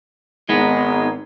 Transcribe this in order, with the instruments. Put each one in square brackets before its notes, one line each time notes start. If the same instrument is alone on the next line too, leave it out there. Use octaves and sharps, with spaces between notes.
[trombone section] G#1 D#4 [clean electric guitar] G#3 B3